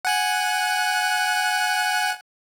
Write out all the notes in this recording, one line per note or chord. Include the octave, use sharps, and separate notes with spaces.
F#5 G#5 F#6